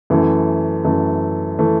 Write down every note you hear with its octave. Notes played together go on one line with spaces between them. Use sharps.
F#2 E3 A3
F#2 E3 A3
E3 A3